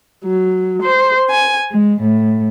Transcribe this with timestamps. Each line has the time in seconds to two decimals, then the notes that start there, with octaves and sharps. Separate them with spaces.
0.24 F#3
0.81 C5
1.30 G#5
1.71 G#3
2.00 A2